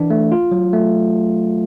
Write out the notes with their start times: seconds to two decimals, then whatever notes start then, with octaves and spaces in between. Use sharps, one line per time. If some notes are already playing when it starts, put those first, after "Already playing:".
Already playing: E3 D4
0.10 A3
0.32 F4
0.51 F#3
0.73 A3